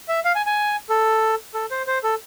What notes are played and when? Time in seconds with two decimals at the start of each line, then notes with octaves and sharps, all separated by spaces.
0.09 E5
0.25 F5
0.36 G#5
0.46 G#5
0.90 A4
1.54 A4
1.71 C5
1.87 C5
2.04 A4